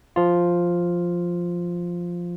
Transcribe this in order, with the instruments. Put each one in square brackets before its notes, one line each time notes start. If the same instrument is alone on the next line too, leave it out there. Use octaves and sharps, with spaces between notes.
[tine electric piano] F3 F4